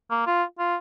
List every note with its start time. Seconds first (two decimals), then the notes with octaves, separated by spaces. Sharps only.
0.11 A#3
0.27 F4
0.59 F4